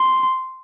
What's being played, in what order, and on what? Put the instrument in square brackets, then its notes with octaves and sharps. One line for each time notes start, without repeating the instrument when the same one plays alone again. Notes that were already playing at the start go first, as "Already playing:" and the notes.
Already playing: [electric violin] C6